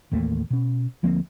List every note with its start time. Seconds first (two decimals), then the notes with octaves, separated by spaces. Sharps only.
0.12 A1 D#2 A3 A#3
0.50 B2 C#4
1.03 D2 F3 A#3 C4